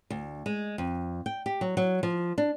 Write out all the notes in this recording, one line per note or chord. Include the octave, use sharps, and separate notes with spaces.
D2
G#3
F2
G5
G4
F#3
F#3
F3
D4